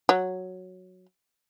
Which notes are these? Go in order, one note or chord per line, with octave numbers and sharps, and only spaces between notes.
F#3